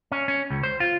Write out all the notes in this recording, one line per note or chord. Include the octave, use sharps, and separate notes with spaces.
C#4
C#4
C#2
C5
F4